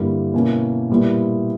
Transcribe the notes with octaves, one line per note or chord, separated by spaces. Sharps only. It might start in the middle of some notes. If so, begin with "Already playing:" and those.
Already playing: G2 D3 G3 A#3 E4
B2 A#3 C#4 E4
A#2 G3 B3 E4